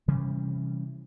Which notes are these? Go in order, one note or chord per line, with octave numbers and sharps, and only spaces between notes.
C3 E3 G3 C#4